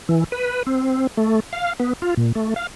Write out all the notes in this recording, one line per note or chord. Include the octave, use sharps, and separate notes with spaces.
E3
B4
C4
A3
F5
B3
F4
A#2
A3
F5